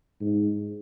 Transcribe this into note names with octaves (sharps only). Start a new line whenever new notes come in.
G#2